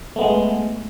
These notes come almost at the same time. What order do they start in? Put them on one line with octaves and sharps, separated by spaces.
A3 B3 G#3